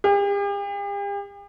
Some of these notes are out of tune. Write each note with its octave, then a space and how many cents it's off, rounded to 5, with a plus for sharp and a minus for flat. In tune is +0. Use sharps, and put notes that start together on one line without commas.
G4 +45